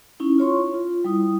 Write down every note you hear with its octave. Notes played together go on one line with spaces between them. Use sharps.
C#4 D#4 E4
F4 C#5 C6 C#6
F4
G3 E4 D#6